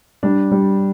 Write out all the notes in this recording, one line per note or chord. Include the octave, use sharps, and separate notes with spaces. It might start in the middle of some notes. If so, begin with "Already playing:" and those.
G3 D4
G3